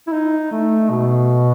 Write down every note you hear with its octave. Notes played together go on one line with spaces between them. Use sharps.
E4
D#4
A3
B2